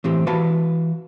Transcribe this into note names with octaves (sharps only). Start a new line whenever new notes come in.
A2 E3 C4 G4
E3 F#4 B4 F5 A5 B5